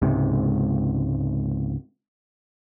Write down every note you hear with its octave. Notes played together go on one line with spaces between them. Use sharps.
C#2 G#2 C3